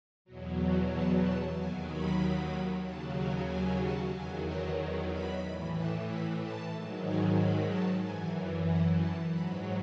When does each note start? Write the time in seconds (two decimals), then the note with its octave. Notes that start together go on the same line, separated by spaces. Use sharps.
0.25 E2 B2 F#3
0.89 A5
1.22 A5
1.55 D#2 D#3 F#3 G#5
1.86 B5
2.83 D#2 C#3 F#3 A5
3.16 G#5
3.48 G#5
3.80 A5
4.13 E2 D#3 F#3 G#5
4.45 F#5
5.10 B5
5.42 A2 E3
5.75 A5
6.07 B5
6.39 A5
6.72 G#2 D#3 F#3
7.04 G#5
7.36 B5
7.68 A5
8.00 F#2 E3 G#5
8.65 F#5
8.98 A5
9.30 G#2 F#3 B5